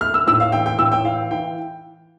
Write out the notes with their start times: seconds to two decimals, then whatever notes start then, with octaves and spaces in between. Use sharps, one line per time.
0.01 A3 F6
0.14 E6
0.27 A2 E6
0.40 F5
0.52 E3 G5
0.66 G5
0.79 A2 E6
0.92 G5
1.04 E3 F5
1.31 E3 G5